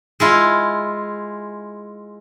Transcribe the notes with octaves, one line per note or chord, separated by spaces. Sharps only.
G#3 E4 F4